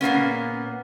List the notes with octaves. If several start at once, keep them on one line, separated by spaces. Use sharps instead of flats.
A#2 A#3 B3 C#4